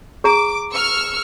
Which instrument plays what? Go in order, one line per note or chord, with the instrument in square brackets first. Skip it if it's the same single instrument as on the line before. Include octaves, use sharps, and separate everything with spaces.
[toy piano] G#4 A#5 [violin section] D6
[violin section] C#6 E6 F6